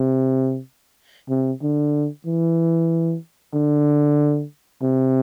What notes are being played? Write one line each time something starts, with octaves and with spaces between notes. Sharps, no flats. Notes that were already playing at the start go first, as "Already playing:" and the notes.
Already playing: C3
C3
D3
E3
D3
C3